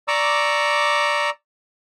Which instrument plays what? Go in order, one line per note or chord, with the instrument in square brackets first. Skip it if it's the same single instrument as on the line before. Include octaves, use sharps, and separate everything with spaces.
[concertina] D5 A#5 C#6 D6 E6